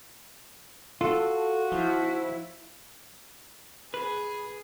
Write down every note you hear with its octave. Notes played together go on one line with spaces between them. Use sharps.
F4 F#4 A4
F3 E4
G#4 B4